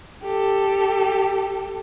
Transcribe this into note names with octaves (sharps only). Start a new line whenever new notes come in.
G4 A4